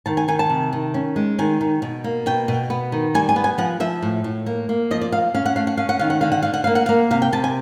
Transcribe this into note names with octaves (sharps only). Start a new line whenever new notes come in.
D#3 A5
G#5
D#3 G#5
A5
C3
D#3
C#4
G#3
D#3 G#5
D#3
B2
A#3
B2 G5
B2
B3
D#3
G3 G#5
G#5
B3
G#5
F3 F#5
F3 E5
A2
A2
A#3
A#3
F3 D#5
D5
A#3 F5
C#4 F5
F#5
A3 F5
F#5
C#4 F5
F#5
D#3 F5
F#5
D3 F5
F#5
D3 F5
F#5
A#3 F5
F#5
F5
A#3
C3 F5
G5
C3 A5
G#5